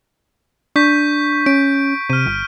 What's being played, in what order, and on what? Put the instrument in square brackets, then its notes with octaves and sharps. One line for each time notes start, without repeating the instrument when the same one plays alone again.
[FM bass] D4 [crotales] C#6 G6 B6
[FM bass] C#4 [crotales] D7
[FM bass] C3 [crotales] F6 D#7
[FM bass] G1